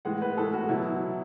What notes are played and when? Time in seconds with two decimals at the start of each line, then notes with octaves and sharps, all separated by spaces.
0.05 A2 E3 G#3 F#5
0.22 B4
0.37 A2 E3 G#3 A4
0.53 F#4
0.69 B2 F#3 E4